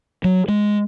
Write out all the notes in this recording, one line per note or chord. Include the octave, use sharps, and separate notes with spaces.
F#3
G#3